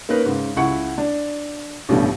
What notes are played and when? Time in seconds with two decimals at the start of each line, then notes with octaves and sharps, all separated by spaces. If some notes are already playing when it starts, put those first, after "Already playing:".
0.09 A#3 C#4 D#4 A#4 B4
0.26 G#2 C#3
0.56 C#2 E4 F#5 C#6 C#7
0.98 D4
1.89 A1 G2 B2 G3 A3